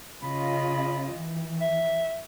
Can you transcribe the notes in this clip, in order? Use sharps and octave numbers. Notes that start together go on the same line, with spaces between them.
C#3 F4 D#5 B5
E3
E5